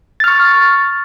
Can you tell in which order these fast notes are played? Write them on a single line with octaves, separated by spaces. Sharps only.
A6 F6 C#6